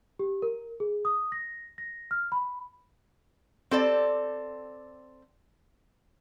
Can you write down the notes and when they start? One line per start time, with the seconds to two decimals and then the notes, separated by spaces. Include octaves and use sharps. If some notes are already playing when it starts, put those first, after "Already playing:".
0.19 G4
0.42 A#4
0.80 G#4
1.05 D#6
1.32 A#6
1.78 A#6
2.11 F6
2.32 B5
3.71 C4 A4 D5